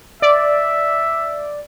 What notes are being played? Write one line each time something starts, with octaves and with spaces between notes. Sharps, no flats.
D5 E5